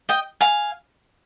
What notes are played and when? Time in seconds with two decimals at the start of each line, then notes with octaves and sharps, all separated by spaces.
0.09 D#5 G5
0.41 F5 G#5